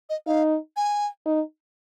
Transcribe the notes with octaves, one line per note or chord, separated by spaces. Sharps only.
D#5
D#4 F5
G#5
D#4